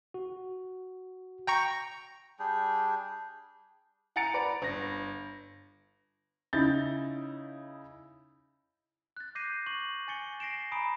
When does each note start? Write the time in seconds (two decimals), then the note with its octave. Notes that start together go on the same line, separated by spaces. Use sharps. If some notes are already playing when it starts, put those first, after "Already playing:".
0.14 F#4
1.47 G5 A#5 C#6
2.39 G3 D4 G#4 G5
4.16 F#5 G#5 A#5 A6 C#7 D7
4.34 B4 D5 A#5
4.62 G1 A#6
6.53 C#3 D#4 E4 G6 A6 G7
9.17 F#6 A6
9.35 D6 G6 A#6 C7 D#7
9.66 C#6 F#7
10.08 G#5 A6 C#7 G7
10.40 A#6 C7 D7 E7
10.72 G#5 A#5 B5 D#6 D7